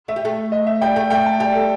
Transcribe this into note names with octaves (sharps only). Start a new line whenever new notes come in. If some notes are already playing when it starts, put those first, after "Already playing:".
A3 E5
G3
A3
D#5
E5
G3 G5
A3 G5
A3 G5
A5
G3 G5
A4